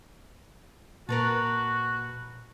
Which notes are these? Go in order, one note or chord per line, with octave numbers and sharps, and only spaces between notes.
A#2 F#4 A#4 B4 A5